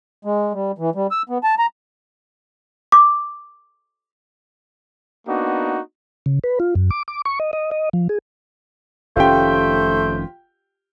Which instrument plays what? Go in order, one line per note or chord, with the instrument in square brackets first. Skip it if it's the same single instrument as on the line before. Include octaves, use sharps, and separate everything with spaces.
[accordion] G#3
G3
E3
G3
E6
B3
A5
A#5
[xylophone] D6
[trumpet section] A#3 B3 D4 D#4 F#4
[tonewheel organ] C#3
B4
F4
F#2
D6
D6
C#6
D#5
D#5
D#5
F3
G#4
[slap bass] F1 D#3 C#4 [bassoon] A3 [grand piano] F4 G4 G5 [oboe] C5